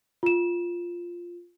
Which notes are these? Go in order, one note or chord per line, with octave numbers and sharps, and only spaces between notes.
F4 E7